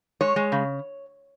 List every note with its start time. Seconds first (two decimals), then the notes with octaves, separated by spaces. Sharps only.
0.21 G#3 C#5
0.36 G#3
0.52 C#3